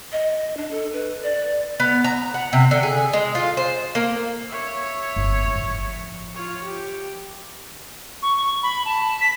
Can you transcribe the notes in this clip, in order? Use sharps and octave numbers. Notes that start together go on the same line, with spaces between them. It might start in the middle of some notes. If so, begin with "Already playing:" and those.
D#5
D4
A4
B4
D5
B3
A#5
F#5
C3
D3
G#4
G#3
F4
C5
A#3
C#5 E5
G1 E4
A2 F3
F4 C#5
G4
C#6
B5
A5
B6